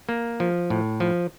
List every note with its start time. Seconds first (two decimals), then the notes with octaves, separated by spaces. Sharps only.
0.09 A#3
0.40 F3
0.70 A2
1.00 F3